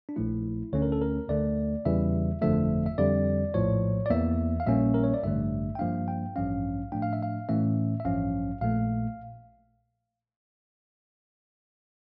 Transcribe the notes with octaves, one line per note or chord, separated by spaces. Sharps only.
D4
A#1 A#2 F3 A3 E4
D2 D3 A3 C#4 C#5
A#4
A4
A#4
D2 D3 A3 D5
E2 C#3 E3 G3 E5
G1 F2 D3 F3 A3 E5
E5
F2 D3 G3 D5
A#1 A2 F3 C#5
D5
E2 E3 A#3 E5
F5
A#1 A#2 G3 A#3 C#4 E5
A#4
C#5
D5
A1 G2 D3 A3 E5
G5
G2 F3 A#3 D4 F5
G5
A1 G2 F3 C#4 F5
A2 F3 A3 D4 G5
F5
E5
F5
A2 E3 A3 C#4 E5
E5
A1 G2 F3 C#4 F5
A#1 A#2 A3 F5